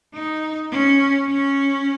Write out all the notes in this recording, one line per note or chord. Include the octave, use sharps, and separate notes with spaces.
D#4
C#4
C#4